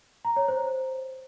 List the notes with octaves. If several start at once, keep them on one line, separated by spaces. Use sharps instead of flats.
A#5
C#5
C5